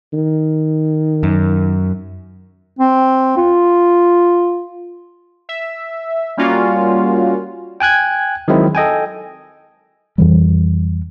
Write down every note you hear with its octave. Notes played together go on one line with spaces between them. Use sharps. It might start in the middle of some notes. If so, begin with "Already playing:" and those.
D#3
F#2
C4
F4
E5
G3 A#3 C#4 F4 F#4
G5 G#5 F#6 G#6
D#3 F#3 G#3 C4 E4
A4 D#5 G5 G#5
F2 E3 G3